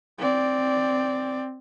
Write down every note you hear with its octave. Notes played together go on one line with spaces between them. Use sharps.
C4 D5